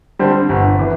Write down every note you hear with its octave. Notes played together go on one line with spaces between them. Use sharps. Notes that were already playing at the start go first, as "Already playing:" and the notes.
D3 G3 C4
G1
E3